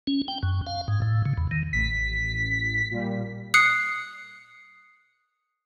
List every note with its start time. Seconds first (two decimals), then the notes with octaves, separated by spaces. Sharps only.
0.07 C#4
0.28 G5
0.43 F#2
0.67 F5
0.88 G#2
1.02 A2
1.26 C#3
1.38 E2
1.51 D#3
1.73 A1 B6
2.91 A#2 G3
3.54 D#6 F#6 C7 C#7